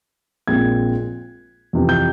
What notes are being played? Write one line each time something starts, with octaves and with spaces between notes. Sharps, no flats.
A#1 A#2 G#3 C4 G#6
F2 C3 E3
G6